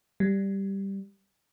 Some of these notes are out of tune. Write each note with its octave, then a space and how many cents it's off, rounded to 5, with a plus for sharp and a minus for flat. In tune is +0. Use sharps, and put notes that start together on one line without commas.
G3 +0